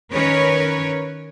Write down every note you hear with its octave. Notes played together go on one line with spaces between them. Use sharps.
D#3 C#4 A#4 B4 C#5